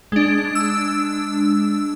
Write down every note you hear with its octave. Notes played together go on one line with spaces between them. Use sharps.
G#3 D4
E6